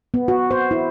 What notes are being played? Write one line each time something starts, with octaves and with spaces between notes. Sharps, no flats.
B3
F#4
C5
E4